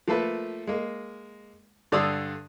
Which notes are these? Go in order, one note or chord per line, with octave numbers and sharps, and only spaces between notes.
F3 A3 A#3 A4 B4
G#3 A#3
G2 D3 D5 C6 D#6 E6